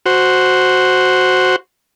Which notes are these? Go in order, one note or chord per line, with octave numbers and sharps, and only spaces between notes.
F#4 C5